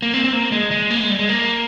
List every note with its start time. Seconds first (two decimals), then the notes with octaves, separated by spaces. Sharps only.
0.02 A#3
0.14 C4
0.24 C4
0.33 A#3
0.52 G#3
0.71 G#3
0.90 A#3
1.00 G#3
1.10 G3
1.19 G#3
1.29 A#3